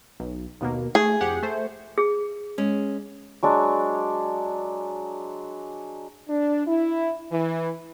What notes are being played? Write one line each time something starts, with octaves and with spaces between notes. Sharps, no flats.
B1
D#2 B2 A#3
A3 G#4
F2 G4 F#5
A3 C5
G#4
G#3 C#4
F#3 G#3 D4
D4
E4
E3